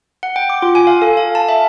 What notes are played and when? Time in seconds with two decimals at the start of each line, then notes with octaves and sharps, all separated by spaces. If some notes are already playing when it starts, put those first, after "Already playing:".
0.23 F#5
0.36 G5
0.50 D6
0.62 F4
0.75 G#5
0.87 F5
1.02 A4
1.17 F5
1.35 A5
1.49 E5